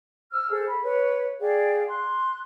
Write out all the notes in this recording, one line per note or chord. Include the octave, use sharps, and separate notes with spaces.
C5 E6 F6
G#4 A4 C5
B5
B4 C#5
G#4 D5 F5 G5
C6 F#6